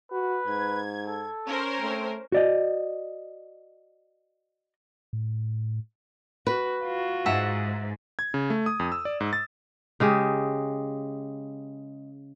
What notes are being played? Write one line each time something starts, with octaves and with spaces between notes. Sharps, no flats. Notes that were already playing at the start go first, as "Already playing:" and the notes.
F#4 B4
G#2 G#6
A4
C#4 A#4 C5
A3 C4
F#4 D5 D#5
A2
F#4 B4
F4 F#4
G#2 E5 F#5 A#5
G#6
C#3
A3
D#6
F2
E6
D5
G#2
A6
C#3 G#3 G4